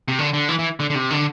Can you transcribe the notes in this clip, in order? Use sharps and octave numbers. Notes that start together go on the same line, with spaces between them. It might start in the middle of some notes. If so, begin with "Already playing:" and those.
C3
D3
D3
E3
E3
D3
D3
C3
D3